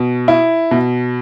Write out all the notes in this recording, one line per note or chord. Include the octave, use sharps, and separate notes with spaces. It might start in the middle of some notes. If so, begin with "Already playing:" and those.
Already playing: B2
E4
B2